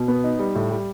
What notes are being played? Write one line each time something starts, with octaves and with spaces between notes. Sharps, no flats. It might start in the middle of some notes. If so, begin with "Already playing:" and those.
Already playing: B2
B3
D#4
G3
A2
G3